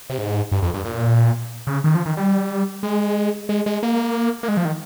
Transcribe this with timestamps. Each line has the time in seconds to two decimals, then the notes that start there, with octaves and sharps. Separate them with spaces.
0.10 C3
0.18 G#2
0.52 G2
0.62 F2
0.74 G2
0.85 A#2
1.67 C#3
1.84 D#3
1.95 F3
2.06 D#3
2.17 G3
2.83 G#3
3.49 G#3
3.66 G#3
3.83 A#3
4.43 A#3
4.48 G#3
4.57 F3
4.65 D#3